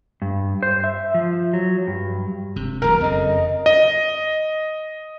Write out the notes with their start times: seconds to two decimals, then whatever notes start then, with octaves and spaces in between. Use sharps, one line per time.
0.22 G2
0.63 C5
0.84 E5
1.14 F3
1.53 F#3
1.87 G2
2.56 E1 C3
2.82 B1 E2 G3 A#4 A#5
3.01 F#1 F2 C#3 D#5
3.66 D#5